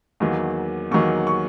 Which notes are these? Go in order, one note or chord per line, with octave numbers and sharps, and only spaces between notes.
E2 D#3 F#3 A#3
E2 D#3 F#3 A#3 C#6
C#6